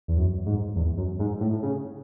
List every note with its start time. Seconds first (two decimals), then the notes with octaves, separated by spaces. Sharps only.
0.08 E2
0.17 F#2
0.46 G#2
0.76 E2
0.97 F#2
1.19 G#2
1.41 A2
1.63 C#3